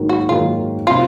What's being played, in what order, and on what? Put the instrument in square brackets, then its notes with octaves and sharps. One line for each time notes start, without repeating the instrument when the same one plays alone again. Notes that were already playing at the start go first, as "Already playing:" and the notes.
Already playing: [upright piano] G#2 D#3 F#3 A#3
[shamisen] F#4
[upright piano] G#2 D#3 F#3 A#3 [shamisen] F4
[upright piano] C3 F#3 C4 [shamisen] F4